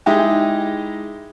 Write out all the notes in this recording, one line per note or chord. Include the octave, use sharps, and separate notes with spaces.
G#3 D#4 E4 G4